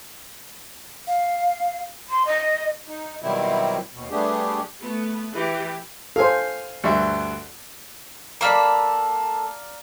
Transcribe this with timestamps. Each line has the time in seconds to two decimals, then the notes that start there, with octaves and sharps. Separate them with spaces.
1.07 F5
2.09 C6
2.25 D#5
2.88 D#4
3.22 B2 D#3 F#3 G3 C4 E4
3.94 D#2 B2
4.11 G3 A3 B3 D4 G4 G#4
4.80 A3 B3
5.33 E3 E4 G4
6.16 A4 C5 F5 G#5
6.84 D2 G2 E5
8.41 A#3 A4 D5 F5 A#5 B5